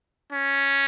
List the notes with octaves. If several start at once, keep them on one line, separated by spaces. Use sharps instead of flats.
C#4